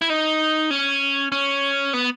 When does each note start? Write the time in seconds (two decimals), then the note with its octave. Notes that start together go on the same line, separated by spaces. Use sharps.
0.02 E4
0.10 D#4
0.71 C#4
1.32 C#4
1.93 B3